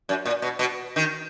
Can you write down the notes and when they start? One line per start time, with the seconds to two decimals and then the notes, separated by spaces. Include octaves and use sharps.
0.09 F#2
0.26 A#2
0.42 B2
0.59 B2
0.96 D#3